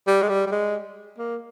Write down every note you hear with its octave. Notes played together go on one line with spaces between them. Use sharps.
G3
G#3
G3
G3
G#3
A#3